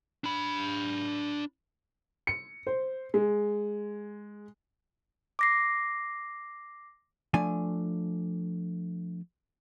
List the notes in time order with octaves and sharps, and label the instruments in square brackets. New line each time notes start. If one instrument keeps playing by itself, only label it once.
[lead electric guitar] D4 B5
[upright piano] C#7
C5
G#3
[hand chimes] D6 A#6 C7
[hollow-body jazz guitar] F3 A3 D4 G#5